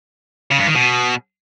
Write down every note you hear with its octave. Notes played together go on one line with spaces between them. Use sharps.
C#3
G2
D#3
B2